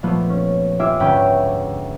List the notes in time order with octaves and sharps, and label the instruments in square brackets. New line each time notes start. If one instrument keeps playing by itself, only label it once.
[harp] A#2 F3 A3 B3
C#4
F4 G4 E5 G#5 D6
D2 G#2 C#4 B4 G5 B6